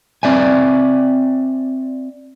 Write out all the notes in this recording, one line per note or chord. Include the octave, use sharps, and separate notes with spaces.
C4 D5 E5 G#5